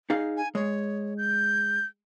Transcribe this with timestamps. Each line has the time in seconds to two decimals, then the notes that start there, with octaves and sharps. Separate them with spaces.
0.10 D#4 G#4 F5
0.37 G#5
0.55 G#3 C#5
1.18 G6